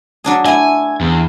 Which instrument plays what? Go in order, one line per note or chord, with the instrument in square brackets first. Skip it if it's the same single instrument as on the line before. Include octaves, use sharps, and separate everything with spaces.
[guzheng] F#3 D4 G#4
[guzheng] A3 E4 [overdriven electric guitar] G#5
[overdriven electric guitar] E2